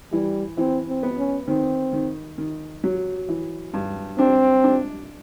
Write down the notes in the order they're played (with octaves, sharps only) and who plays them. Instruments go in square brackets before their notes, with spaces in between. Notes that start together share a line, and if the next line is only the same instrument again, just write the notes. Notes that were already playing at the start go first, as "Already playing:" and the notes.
[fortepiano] E3 [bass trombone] G3
[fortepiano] E3 [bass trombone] C4
[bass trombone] C4
[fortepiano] B3
[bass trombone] C#4
[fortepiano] D#3 [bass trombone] C4
[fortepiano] D#3
D#3
F#3
E3
G2
[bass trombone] C4 [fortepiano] D4
[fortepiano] D4